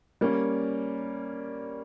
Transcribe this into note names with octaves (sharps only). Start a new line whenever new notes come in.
G3 A#3 C#4